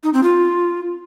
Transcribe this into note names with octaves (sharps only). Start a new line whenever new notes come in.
D#4
C4
F4